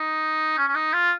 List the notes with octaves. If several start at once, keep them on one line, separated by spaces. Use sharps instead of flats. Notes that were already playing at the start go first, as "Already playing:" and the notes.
Already playing: D#4
C#4
C#4
D#4
F4